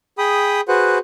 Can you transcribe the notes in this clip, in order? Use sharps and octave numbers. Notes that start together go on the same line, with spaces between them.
G#4 G5 B5 D#6
F#4 G#4 B4 C5 F#5